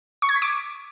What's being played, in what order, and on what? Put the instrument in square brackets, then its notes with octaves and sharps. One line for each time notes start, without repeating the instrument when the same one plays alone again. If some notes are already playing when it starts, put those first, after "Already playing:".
[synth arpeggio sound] C#6
G#6
B6
D6